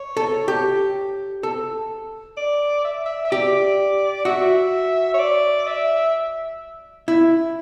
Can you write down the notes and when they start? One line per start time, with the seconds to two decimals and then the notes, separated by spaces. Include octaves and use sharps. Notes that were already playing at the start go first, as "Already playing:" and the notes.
Already playing: C#5
0.17 A4
0.48 G4
1.43 A4
2.37 D5
2.84 E5
3.06 E5
3.25 E5
3.31 G4 D5
4.25 F#4 E5
5.14 C#5
5.19 D5
5.67 E5
7.08 E4